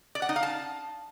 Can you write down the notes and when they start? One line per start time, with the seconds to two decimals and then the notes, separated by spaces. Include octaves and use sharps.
0.15 D5
0.22 F#5
0.29 D#4
0.36 F5
0.43 A5